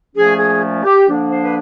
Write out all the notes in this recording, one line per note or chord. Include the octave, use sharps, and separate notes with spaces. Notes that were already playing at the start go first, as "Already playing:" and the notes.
A#2 F3 A3 C#4 G#4
G#4
G4
D3 F3 A#3 D4
C5
B4